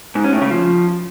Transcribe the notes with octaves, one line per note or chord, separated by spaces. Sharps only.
G#2
C#4
A2
C#3
F3